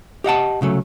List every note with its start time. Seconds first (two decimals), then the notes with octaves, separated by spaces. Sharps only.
0.24 G4 D#5 F#5 A5
0.61 C2 C#3 F#3 A3